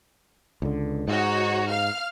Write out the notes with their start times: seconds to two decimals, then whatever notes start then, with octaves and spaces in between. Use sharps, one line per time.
0.62 C#2 D3
1.08 G#2 D#4 F#4 C#5
1.70 F5 F6